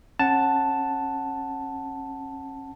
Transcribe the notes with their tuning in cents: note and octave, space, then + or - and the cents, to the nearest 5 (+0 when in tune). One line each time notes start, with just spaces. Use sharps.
C#4 -35 F#5 +0 A5 +0